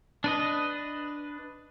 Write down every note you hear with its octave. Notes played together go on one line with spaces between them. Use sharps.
D4 B4 D#5